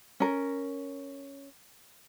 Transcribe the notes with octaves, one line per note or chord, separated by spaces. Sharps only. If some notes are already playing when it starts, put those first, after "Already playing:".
C#4 A#4